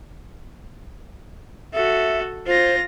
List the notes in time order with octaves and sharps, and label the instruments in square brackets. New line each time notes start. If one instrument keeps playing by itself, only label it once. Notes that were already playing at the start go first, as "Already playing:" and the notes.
[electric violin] F#4 A4 [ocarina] E5
[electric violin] F4 A#6 [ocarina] C5